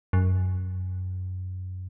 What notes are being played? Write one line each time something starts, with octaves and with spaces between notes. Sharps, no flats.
F#2